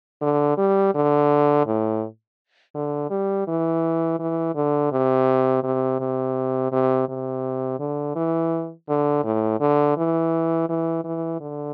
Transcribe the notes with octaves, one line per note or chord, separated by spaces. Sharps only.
D3
G3
D3
A2
D3
G3
E3
E3
D3
C3
C3
C3
C3
C3
D3
E3
D3
A2
D3
E3
E3
E3
D3